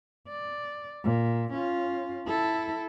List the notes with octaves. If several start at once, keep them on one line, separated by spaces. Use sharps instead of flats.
D5
A#2
C#4 F4
E4 A4